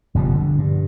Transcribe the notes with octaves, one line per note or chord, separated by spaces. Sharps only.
F#1 B2 F3 G3
D3
G2